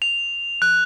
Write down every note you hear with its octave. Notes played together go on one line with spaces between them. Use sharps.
F7
F#6